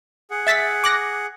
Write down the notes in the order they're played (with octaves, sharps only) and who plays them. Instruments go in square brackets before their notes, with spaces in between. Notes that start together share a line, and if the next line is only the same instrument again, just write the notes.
[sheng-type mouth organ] G#4 F#5
[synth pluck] E5 A6 B6
D6 F#6 A#6